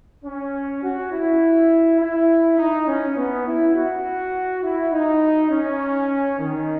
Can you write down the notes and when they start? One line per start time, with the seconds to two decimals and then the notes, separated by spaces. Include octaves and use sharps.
0.25 C#4
0.83 F#4
1.13 E4
2.01 E4
2.58 D#4
2.88 C#4
3.18 B3
3.47 E4
3.76 F#4
4.63 E4
4.93 D#4
5.51 C#4
6.39 D#3